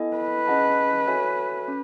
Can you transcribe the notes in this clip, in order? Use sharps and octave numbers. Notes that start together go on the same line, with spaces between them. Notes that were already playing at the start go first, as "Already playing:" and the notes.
Already playing: B3 E4 A4 D#5 G#5
B4
C#4 G#4 D#5 F#5 A5
F#4 A4 C#5 E5 G#5
C#4